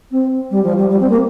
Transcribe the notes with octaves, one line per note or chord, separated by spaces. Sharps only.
C4
G3
F3
G3
G3
C4
A#3